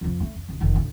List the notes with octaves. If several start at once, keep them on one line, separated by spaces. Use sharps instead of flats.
F2 F3
A3
F2
D1 D#3
F1 D#3
D2 A2